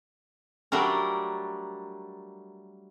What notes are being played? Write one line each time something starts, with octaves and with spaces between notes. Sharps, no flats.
F#3 G3 A3 D4 A#4